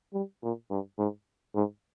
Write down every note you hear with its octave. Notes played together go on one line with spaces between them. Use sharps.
G3
A#2
G2
G#2
G#2